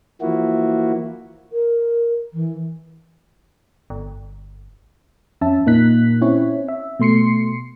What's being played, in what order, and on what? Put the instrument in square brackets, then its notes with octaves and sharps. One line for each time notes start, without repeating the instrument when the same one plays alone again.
[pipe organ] E3 F3 A#3 E4 F#4
[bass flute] A#4
E3
[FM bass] G1
[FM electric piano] F2 C#4 E5 A5
A#2 A#3 D#4 F#6 B6
C4 C#4 E4 C#5
E5
B2 A3 C6 C7 C#7